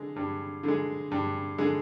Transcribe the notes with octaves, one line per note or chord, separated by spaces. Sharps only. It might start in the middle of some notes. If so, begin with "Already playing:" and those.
Already playing: D3 G#3
G2
D3 G#3
G2
D3 G#3